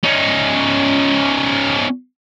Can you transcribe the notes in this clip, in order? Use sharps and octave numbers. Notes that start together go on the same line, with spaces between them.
C#4 D#4